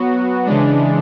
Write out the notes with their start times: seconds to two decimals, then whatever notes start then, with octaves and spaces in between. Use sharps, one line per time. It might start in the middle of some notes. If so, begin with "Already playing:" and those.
Already playing: F#3 B3 F#4
0.46 C#3 E3 G#3 D4